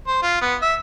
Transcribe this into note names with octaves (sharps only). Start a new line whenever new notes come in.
C5
F4
B3
E5